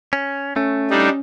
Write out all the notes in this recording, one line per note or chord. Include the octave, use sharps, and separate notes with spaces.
C#4
A3 C#4
G3 D4 D#4